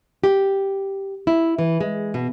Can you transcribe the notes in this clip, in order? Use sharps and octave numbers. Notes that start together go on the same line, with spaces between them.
G4
E4
E3
G#3
B2